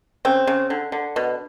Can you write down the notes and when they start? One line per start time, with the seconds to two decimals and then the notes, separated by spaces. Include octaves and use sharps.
0.25 C#3 C4
0.47 C#3
0.70 D3
0.92 D3
1.16 B2